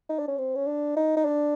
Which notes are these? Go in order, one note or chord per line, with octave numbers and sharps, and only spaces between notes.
D#4
D4
C#4
C4
C#4
D4
D#4
D#4
D4